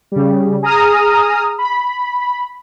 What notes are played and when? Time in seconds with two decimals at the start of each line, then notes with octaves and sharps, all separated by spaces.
0.12 C#3 G3
0.63 G#4 A#5 D#6 F6
1.58 B5